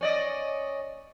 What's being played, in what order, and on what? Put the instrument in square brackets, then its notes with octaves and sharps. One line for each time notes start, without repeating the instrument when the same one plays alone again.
[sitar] C#4 D5 D#5